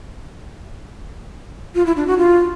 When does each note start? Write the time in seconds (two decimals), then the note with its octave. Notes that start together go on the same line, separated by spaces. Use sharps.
1.75 F4
1.86 E4
1.96 D4
2.07 F#4
2.18 F4